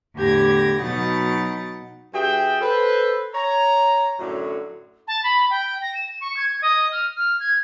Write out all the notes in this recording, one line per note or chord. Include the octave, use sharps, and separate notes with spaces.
E2 A2 D3 G4 G#6 A#6
B2 F#3 D#4 F#5 A6
G2 F#4 G#4 E5 G5
A4 B4 C5
C#5 A#5
F#2 A2 D3 F#3
A5
B5
G5
A#6
E7
C#6
G#6
D#5
F6
F6
G#6